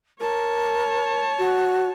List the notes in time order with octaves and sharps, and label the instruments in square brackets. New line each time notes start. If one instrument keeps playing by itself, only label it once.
[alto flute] A#4 [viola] C#5 A5
[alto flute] F#4